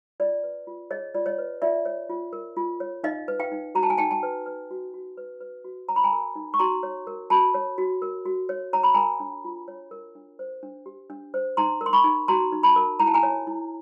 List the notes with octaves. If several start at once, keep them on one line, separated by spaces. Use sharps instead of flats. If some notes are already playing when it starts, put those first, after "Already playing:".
F4 D5
B4
F4
G#4 C#5 D#5
F4 D5
C#5 D#5
B4
F4 D5 E5
C#5
F4
A#4
F4
C#5
D#4 D#5 F5
B4
F5 G5
D#4
F#4 A#5
A5
G#5
D#4 G5 A5
G5 A5
B4
B4
F#4
F#4
B4
B4
F#4
C#5 A#5
B5
G#5 A#5
A#4
D#4
C#6
F#4 A#5 C6
C#5
A#4
F#4 A5 B5
C#5
F#4
A#4
F#4
C#5
C#5 A#5
B5
A#4 G#5 A#5
D4
F4
C#5
A#4
D4
C5
D4
G4
D4
C5
D#4 A#5 C6
A#4
C6
B5 C#6
D#4
F#4 A#5 C6
D#4
A5 B5
A#4
E4 A#5
A5
G#5 A#5
C#5
E4